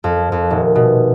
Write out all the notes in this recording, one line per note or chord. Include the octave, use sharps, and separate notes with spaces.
F2
F2
D#1
B2